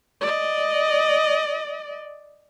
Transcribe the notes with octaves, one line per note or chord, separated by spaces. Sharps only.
D5 D#5